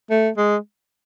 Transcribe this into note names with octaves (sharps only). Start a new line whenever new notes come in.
A3
G#3